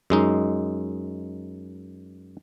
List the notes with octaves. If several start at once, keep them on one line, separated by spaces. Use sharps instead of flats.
F#2 G#3 D#4